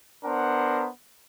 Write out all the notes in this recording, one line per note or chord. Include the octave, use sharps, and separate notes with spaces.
B3 D4 A#4 C5 F#5 A#5